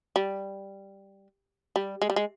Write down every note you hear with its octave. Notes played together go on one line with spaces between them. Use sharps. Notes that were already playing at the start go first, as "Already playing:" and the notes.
G3
G3
G#3
G3
G#3